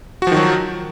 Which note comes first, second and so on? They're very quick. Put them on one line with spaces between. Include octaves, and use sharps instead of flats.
F#4 F3 D#3 F#3